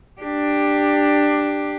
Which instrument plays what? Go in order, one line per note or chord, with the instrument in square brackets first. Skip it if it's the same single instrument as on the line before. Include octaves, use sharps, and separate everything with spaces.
[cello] D4 G4